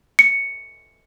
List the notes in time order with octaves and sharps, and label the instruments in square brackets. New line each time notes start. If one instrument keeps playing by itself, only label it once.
[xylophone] C#7